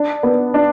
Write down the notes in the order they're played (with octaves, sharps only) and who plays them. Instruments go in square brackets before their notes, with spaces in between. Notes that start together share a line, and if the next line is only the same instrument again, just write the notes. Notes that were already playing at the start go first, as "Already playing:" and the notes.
Already playing: [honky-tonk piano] D4
B3
D4